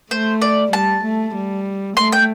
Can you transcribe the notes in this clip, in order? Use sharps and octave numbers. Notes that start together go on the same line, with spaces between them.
A3 C5
D5
G3 A5
A3
G3
A3 C6
G5